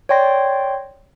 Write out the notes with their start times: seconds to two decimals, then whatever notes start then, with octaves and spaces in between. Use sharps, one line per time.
0.09 C#5 D5 G5 C6 A#6